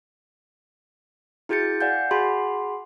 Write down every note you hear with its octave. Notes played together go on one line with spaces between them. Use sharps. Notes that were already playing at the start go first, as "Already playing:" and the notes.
E4 F#4 G#4 G6 A6 C#7
D5 F5 F#5 G#5 G6
F#4 G#4 F#5 G#5 B5 C6